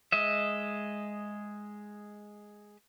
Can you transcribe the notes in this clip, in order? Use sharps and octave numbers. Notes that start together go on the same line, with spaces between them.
G#3 D#5 E5